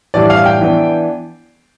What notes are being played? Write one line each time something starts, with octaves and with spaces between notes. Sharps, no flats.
A2 E3 G3 D4 D5
F5
G5
E3 B3 D4